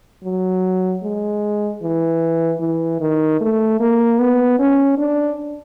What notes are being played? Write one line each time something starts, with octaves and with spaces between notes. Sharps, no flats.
F#3
G#3
E3
E3
D#3
A3
A#3
B3
C#4
D4